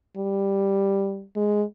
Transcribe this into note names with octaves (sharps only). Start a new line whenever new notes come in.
G3
G#3